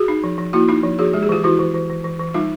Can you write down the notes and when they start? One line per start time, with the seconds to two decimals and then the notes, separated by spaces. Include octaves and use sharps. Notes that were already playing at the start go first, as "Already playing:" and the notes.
Already playing: F#4 G#4
0.08 D#4
0.24 F3
0.38 F3
0.53 A#3 E4 F#4
0.68 D#4 F4
0.83 F3
0.99 F3 F#4 G#4
1.13 G#3 G4
1.23 G#4
1.29 E3 F4 G4
1.44 E3 E4 F#4
1.59 E3
1.74 E3
1.90 E3
2.04 E3
2.19 E3
2.34 G3 D#4 F4